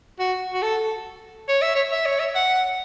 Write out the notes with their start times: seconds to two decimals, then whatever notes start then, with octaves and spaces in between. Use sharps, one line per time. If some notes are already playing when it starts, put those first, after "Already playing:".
0.19 F#4
0.53 F#4
0.62 A4
1.49 C#5
1.62 E5
1.75 C#5
1.92 E5
2.06 C#5
2.20 E5
2.35 F#5